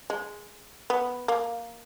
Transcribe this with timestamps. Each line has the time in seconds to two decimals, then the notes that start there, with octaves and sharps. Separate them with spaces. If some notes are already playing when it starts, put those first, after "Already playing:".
0.10 G#3
0.90 B3
1.28 A#3